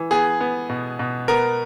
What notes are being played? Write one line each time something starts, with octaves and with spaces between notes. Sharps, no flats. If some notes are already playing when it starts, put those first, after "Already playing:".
Already playing: E3
B3 G#4
B3
B2
B2
B3 A#4